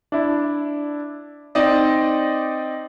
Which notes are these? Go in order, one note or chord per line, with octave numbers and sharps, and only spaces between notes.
D4 E4
C4 D#4 D5 D#5